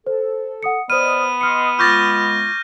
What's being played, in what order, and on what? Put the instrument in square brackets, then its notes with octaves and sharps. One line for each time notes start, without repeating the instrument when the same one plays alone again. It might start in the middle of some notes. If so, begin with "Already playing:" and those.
[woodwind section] A4 [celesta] C5
[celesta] F#5 D#6 C#7
[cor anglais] B3 [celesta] C5 F6 [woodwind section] D5 D#5 D#6 [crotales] D#7
[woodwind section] D#5 C6 D#6 [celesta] F6 C#7
[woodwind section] G#3 F4 [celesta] C#6 D6 A6 [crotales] F6 G6 A#6